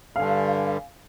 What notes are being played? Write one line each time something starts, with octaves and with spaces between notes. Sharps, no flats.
G2 D3 F5 G#5